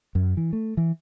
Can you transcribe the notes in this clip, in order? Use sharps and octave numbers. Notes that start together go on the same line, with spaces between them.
F#2
E3
A3
E3